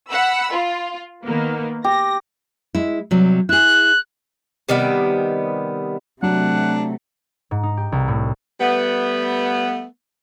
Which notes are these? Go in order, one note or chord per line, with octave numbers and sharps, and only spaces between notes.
F#5 B5 E6
F4
D#3 A#3 B3
G4 A#6
G#3 E4
C3 F#3 G3
E4 G#4 F#6
C3 D#3 G3 B3
C3 F#3 A3 D4 F#5
G#2
D#4
G4
C2
A2
G3 A3 B3